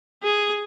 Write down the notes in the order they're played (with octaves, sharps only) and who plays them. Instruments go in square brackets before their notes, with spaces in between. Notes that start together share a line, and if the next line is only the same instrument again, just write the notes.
[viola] G#4